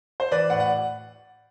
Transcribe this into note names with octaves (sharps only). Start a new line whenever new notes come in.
C5
E3 B4 D5
A2 D5 F#5
F#5